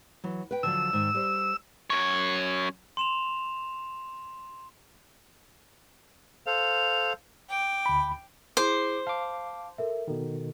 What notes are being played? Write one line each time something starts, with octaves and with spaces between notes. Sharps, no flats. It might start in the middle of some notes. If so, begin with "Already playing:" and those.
E3 F#3
B4 G5
D3 F3 F#3 E6
G#2 D#3
G3 C5
F#2 C#5
C6 E7 F7
A4 C5 F5 F7
G5 D6
D2 B5
E4 G#4 C5 C6 D6
F5 A5 D6
A4 A#4 E5
B2 D#3 A4